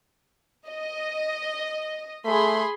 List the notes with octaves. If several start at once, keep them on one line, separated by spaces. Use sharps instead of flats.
D#5
A3 G#4 B5 C6